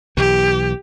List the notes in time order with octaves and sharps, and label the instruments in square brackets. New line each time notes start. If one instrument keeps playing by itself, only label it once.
[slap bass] B1 E3 [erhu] G4